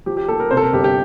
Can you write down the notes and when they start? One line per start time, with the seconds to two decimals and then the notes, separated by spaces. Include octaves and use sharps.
0.06 F3 G4
0.17 G4
0.28 A#3 A4
0.40 A#4
0.51 C3 C5
0.57 A4
0.61 A#4
0.73 G1 G4
0.84 G4